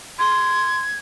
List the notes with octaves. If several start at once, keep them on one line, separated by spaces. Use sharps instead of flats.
C6 G#6